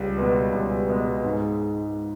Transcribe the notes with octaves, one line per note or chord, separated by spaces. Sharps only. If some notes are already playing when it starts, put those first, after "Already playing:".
Already playing: C#2 G3
B2 G#3 B3
C#2
B2 G#3 B3
G#2 G#3